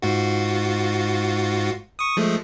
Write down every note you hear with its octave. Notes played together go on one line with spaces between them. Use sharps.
G#2 F4 F#4
C#6 D#6
F3 G#3 A3